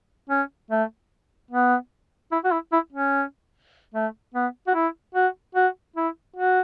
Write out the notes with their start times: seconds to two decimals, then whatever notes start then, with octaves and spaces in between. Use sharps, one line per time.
0.30 C#4
0.71 A3
1.51 B3
2.32 E4
2.44 F#4
2.52 E4
2.73 E4
2.92 C#4
3.94 A3
4.34 B3
4.67 F#4
4.75 E4
5.15 F#4
5.55 F#4
5.96 E4
6.36 F#4